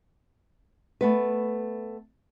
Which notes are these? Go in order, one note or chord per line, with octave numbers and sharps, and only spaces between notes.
A3 B3 B4